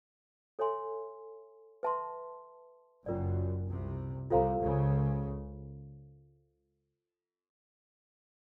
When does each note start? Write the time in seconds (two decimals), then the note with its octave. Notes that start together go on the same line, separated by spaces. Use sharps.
0.59 A4 C#5 E5 G#5 C6
1.83 B4 E5 A5 C6
3.06 F#1 F#2 C#4 F4 A#4 D5
3.69 C2 C3
4.30 C2 C3 F4 A4 C5 F5 A#5
4.61 C#2 C#3